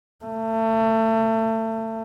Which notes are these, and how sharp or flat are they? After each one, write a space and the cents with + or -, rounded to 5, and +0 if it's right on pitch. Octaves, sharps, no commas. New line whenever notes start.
A3 +30